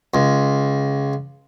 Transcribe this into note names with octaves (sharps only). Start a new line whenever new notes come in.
C#2